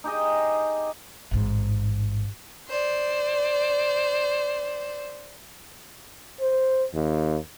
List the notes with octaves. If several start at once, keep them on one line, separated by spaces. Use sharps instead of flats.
D#4 G4 G#4 D#5
A1 G#2
C5 D5
C5
D#2